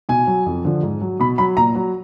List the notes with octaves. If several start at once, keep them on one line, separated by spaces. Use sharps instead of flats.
B2 G#5
F#3
F2
D3 F3
G#2
F#3
B2 B5
F#3 B5
A#2 A#5
F#3